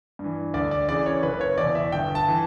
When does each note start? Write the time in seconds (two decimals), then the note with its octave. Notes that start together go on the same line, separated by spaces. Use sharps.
0.19 G2 E3
0.54 D2 D5
0.71 D5
0.89 C#3 E3 D5
1.06 C#5
1.23 F#1 B4
1.41 C#5
1.58 E2 B2 D5
1.75 E5
1.92 G1 G5
2.15 A5
2.28 E3